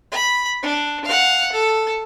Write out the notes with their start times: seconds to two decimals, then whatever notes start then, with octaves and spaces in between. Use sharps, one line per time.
0.12 B5
0.62 D4
1.05 F5 F#5
1.52 A4